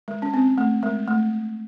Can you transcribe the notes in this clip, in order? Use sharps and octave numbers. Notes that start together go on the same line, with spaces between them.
G#3
C#4
C4
A3
G#3
A3